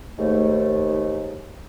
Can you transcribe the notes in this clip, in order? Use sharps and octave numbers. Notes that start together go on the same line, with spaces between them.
D#2 G#2 A3